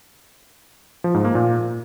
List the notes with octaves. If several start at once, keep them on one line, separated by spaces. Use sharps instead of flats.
F3
G#2
A#3
A#2